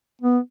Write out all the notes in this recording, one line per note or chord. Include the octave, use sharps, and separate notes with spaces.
B3